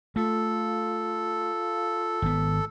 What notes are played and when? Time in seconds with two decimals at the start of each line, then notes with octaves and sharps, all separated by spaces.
0.16 A3 F4 A4
2.22 G#1 B3